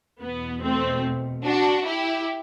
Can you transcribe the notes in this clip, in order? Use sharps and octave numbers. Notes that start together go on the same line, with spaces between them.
E2 B2 B3
A3 C4
D4 F#4
E4 G4